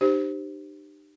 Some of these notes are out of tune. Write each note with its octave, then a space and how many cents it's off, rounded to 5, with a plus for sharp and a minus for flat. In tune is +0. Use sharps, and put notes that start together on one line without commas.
D#4 -45 G4 -5 C5 +0